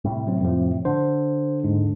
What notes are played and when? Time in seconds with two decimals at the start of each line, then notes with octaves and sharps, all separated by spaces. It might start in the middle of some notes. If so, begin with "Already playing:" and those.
0.04 A2 C3 G3
0.27 F#3 C4
0.41 F2 F3
0.85 D3 C5
1.64 D#2 G#2